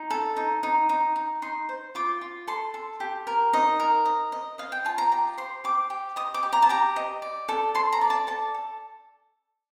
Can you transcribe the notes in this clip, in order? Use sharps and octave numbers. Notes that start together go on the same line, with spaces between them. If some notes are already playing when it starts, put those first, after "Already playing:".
Already playing: D#4
A4
D#4
D#4
D#4
D#4
D#4 C6
C5
F4 D6
F4
A4 C6
A4
G4
A#4
D#4 D#5
A#4
D#5
D#5
D#5 F5
G5
F4 A5
A#5
G4 A#5
C5 C6
G4 D6
G4
D#5 D#6
D6
G4
A#5
A5
G4 A#5
D#5
D5
A4
A4 C6
A#5
D5
A5
A4 A5
A4